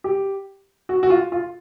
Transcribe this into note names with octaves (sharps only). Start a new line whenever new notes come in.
G4
F#4
F#4
F4
F4